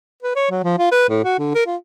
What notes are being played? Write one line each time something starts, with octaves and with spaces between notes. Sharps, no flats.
B4
C#5
F#3
F3
F4
B4
A2
F#4
D3
A#4
F4